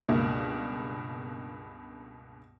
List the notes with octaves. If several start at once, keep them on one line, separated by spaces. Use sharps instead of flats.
C#2 G2 B2 A#3